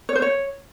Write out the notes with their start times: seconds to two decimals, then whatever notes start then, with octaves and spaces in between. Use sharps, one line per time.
0.09 C#5
0.15 C5
0.22 C#5